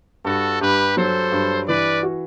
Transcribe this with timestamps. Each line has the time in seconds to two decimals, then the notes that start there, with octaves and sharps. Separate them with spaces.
0.25 G2 F#4 A4
0.60 G2 G4 B4
0.96 F#3 A4 C5
1.32 G2
1.67 E3 B4 D5
2.03 F#4